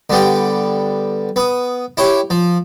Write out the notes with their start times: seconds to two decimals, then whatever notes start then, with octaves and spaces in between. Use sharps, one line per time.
0.10 D3 G3 B3 G4
1.36 B3 D#6
1.97 E4 G4 C#5
2.30 F3